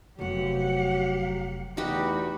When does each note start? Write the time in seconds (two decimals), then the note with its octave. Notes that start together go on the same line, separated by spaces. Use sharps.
0.19 F1 F#3 B3 G4 F#5
1.77 E2 A3 D#4 F#4 G4 B4